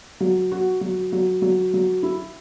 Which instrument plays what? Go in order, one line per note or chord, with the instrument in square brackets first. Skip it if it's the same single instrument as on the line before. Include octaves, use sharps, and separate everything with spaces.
[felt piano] F#3
F#4
F#3
F#3
F#3
F#3
E4